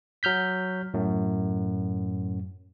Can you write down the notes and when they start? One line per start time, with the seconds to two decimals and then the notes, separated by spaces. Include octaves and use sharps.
0.23 F#3 F6 G6 B6
0.94 F#2 A2